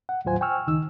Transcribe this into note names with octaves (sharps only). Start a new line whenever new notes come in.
F#5
D#2 A2 F#3 F4 C5 G#5
G5 G#5 C#6 E6 F6
C#2 D#3 D#4 E6